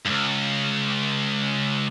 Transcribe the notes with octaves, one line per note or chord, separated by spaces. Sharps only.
C#2 G2